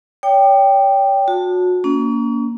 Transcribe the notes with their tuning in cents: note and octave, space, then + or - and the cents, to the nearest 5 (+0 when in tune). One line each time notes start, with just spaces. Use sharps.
C#5 +35 G5 +0 D6 +45
F#4 -35 A5 +0
A#3 +5 C#4 +40